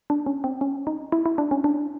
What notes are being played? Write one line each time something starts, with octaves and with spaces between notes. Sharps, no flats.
D4
C#4
C4
C#4
D#4
E4
E4
D4
C#4
D4